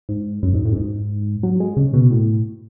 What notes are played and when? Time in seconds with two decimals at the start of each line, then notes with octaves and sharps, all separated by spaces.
0.09 G#2
0.43 F#2
0.54 G#2
0.65 A2
0.72 F#2
0.76 G#2
1.43 F#3
1.60 G#3
1.77 C#3
1.94 B2
2.10 A2